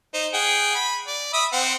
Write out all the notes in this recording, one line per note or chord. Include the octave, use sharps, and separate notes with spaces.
D#4 C5
G#4 F#5 G5
B5
D5
E5 B5 D#6
C4 F#5